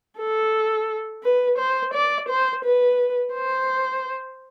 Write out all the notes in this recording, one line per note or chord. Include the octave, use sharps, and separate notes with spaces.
A4
B4
C5
D5
C5
B4
C5